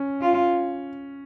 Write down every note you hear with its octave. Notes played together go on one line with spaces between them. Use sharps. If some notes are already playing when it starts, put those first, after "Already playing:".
Already playing: C#4
F4